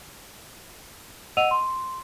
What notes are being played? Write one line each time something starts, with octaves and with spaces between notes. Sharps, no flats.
D#5 F#5 E6 D#7 F7
C6